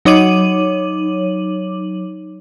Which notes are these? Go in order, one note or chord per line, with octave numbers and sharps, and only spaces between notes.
F#3 D#4 C#5 D6 D#7 F#7